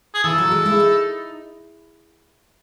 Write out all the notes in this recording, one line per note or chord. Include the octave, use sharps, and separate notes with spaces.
G#4
E3 A4
F#3
G#3
E4
D#4